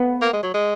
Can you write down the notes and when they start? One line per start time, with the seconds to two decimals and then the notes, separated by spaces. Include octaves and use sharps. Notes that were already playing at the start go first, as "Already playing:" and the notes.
Already playing: B3
0.21 A#3
0.33 G#3
0.43 F#3
0.54 G#3